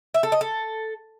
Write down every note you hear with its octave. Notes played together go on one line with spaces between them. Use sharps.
E5
A4
D#5
A4